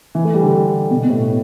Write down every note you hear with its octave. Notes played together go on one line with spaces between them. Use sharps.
E3
A3
G3
D3
B2
B2
A2